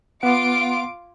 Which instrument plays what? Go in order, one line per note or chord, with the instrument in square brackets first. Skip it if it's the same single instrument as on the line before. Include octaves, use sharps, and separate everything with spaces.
[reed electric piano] B3 F#5 [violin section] F4 D6 D7